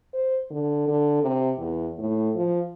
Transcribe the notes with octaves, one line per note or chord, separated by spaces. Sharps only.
C5
D3
D3
C3
E2
A2
F3